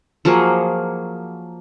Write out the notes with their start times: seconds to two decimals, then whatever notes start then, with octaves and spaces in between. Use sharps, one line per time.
0.25 F3 F#3 A#3 G#4